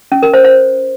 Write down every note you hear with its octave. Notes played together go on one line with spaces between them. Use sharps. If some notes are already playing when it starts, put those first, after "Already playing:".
C#4
A#4
C5
C5